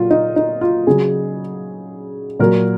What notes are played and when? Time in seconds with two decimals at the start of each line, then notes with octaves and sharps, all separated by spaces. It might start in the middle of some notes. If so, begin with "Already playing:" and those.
Already playing: A#2 F#3 F4
0.11 D#4
0.36 D#4
0.61 F4
0.87 C#3 F#3 G#4
2.39 A#2 F#3 A#4